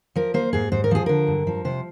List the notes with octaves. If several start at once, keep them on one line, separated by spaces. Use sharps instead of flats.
F3 A#4
A#3 C5
G#2 G#4
G#2 C5
A#4
F3 G#4
D3 A#4
G2
F3
C3 C5